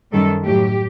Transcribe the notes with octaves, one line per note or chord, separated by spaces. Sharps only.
F#2 D#3 G3 A4
A2 F#3 G4